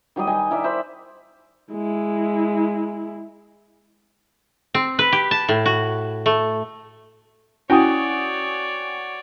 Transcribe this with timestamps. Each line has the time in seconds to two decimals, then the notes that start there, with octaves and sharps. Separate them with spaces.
0.16 D#3 F#3 G3 D#5
0.27 D#5 G5 G#5
0.51 E4 A#4 D5 E5
0.64 C5 E5 B5
1.72 G#3 E4
4.74 C4
4.99 B4
5.12 G4
5.31 A5
5.49 A2
5.66 F#4
6.26 A3
7.70 C#4 E4 F#4 C#5 D5 G5 G#5 D#6